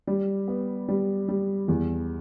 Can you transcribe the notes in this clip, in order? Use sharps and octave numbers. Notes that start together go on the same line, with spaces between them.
G3
B3
G3
G3
E2